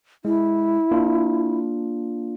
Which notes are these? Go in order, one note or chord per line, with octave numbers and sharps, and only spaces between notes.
G#3 E4
A#3 D4 F4